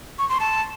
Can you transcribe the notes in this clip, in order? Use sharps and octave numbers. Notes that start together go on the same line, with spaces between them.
C#6
C6
A5